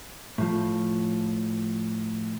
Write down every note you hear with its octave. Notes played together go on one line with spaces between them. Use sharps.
A2 F3